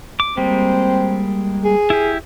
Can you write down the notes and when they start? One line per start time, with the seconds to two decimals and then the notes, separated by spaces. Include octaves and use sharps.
0.20 D6
0.37 G3 G#3 A#3 C4
1.65 G#4
1.90 E4 G4